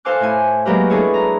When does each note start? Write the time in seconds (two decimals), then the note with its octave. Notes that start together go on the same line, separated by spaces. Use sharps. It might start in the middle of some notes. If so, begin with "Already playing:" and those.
0.05 A4 C5 F5 G#5 D6 F#6
0.20 A2 E4 G#5
0.65 F#3 G#3 A#3 G4 A#4 B4
0.90 B3 D4 E4 G#4 A4 C#5
1.14 A#5